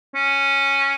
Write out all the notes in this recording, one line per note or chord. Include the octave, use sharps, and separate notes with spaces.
C#4